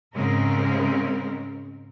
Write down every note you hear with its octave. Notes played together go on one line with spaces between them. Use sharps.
G#2 C#3 G#3 C4 A#4